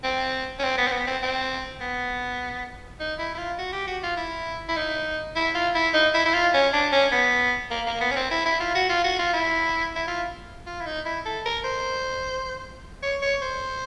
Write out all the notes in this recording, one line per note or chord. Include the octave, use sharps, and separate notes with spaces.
C4
C#4
C4
B3
C4
B3
C4
C4
B3
D#4
E4
E4
F4
F#4
G4
F#4
F4
E4
E4
D#4
E4
F4
E4
D#4
E4
E4
F4
C#4
D4
C#4
B3
A#3
A#3
B3
C#4
C4
E4
E4
F4
F#4
F4
F#4
F4
E4
E4
F4
F4
E4
D#4
E4
A4
A#4
C5
C#5
C#5
C5